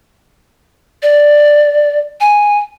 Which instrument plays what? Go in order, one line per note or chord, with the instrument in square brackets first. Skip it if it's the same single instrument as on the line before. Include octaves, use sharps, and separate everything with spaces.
[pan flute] D5
G#5